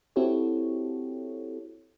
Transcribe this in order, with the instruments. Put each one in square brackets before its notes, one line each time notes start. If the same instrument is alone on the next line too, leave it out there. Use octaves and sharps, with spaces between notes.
[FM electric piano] C4 E4 F#4 G4 A4 C#5